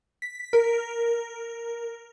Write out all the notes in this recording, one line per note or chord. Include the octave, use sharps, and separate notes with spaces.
B6
A#4